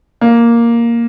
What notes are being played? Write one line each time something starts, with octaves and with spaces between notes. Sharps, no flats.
A#3